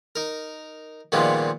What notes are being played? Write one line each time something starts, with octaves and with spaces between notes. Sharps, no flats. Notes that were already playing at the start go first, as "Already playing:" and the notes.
D#4 A#4
A#2 D#3 F3 G3 G#3 B3